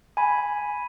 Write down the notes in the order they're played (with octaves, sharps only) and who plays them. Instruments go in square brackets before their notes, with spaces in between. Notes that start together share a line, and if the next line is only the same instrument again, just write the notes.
[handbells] G#5 B5